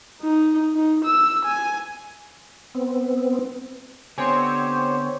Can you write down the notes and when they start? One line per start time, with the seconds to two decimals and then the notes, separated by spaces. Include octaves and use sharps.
0.21 D#4
0.75 D#4
1.05 E6
1.45 G#5
2.75 B3 C4
4.18 D3 B3 C4 G4 C5 C#5 G#5 C6